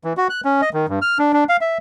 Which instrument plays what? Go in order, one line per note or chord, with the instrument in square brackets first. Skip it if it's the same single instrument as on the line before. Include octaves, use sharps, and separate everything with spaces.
[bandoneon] E3
F#4
F#6
C#4
D#5
D#3
G2
F6
D4
D4
F5
E5